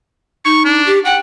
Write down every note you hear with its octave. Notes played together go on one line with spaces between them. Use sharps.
D#4 C#6
D4
G4
F#5 G5